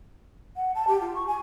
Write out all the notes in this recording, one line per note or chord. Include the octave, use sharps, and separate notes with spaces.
F#5
A5
G4
F4
C#6
G#5